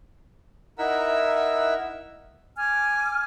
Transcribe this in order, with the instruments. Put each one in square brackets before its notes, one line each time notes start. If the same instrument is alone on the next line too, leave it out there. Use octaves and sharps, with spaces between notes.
[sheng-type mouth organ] D#4 E4 A#4 E5 F#5 E6
[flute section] G#5 D6 F6